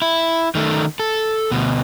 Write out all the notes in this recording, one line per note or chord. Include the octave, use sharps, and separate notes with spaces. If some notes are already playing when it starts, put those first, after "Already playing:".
E4
D#3 A3
A4
D2 B2